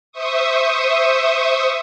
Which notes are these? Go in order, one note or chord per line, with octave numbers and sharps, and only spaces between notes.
C5 E5 C#6 D#6